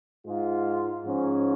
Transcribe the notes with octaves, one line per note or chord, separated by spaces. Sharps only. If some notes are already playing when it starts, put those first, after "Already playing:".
G#2 G#3 F4
G#2 F3 C#4